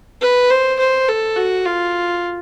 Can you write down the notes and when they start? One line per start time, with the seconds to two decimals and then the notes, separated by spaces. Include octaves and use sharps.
0.21 B4
0.50 C5
0.79 C5
1.08 A4
1.36 F#4
1.65 F4